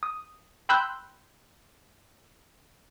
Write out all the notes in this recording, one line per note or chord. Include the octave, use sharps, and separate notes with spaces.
D#6
G5 B5 C6 E6 F#6 G6